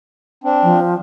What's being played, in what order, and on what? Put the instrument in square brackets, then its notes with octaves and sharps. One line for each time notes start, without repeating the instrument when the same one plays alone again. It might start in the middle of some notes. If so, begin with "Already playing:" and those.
[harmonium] C4 D4
[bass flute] F3